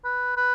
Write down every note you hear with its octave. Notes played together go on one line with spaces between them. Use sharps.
B4
B4